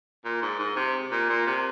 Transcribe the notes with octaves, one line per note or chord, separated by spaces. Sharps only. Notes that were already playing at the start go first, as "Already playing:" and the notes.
A#2
G#2
G#2
C3
A#2
A#2
C3